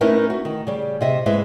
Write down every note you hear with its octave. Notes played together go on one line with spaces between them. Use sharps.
A3 C#4 D#4 E4 A#4 B4
F#4
D#3
C#3 G3
C3 D#5 E5
G#2 G#3 E4 B4 E5